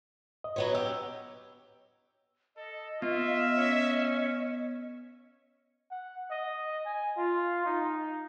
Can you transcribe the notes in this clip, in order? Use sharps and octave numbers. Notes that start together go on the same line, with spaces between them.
D#5
F#3 B3 C#5
G4 E6
A4 D#5
B3 F4 E5
C#4
F#5
D#5
G#5
F4
D#4